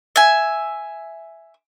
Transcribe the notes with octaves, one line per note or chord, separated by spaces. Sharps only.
E5 G#5